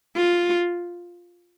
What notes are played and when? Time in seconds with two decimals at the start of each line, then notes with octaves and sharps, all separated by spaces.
0.17 F4